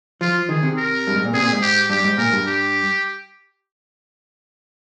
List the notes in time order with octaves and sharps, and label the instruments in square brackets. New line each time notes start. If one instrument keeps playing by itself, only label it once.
[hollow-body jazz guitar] F3 [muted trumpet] F4
[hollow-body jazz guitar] D#3 [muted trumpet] G#4
[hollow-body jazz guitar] C3
[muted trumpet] A#4
[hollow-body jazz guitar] G2
G#2
A#2
[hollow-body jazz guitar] C3 [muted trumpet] G#4
[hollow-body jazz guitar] A#2
G#2
[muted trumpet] G4
[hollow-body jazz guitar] G2 [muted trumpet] G4
[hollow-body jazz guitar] G#2
[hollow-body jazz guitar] A#2 [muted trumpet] A#4
[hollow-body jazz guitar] G2
[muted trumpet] G4